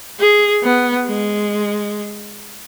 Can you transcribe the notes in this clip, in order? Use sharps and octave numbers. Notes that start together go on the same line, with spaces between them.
G#4
B3
G#3